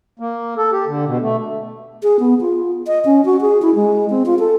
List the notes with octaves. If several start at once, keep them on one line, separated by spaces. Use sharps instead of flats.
A#3
A4
G4
D3
B2
A3
G#4
B3
F4
D#5
C#4
F#4
G#4
E4
G#3
C4
F4
A4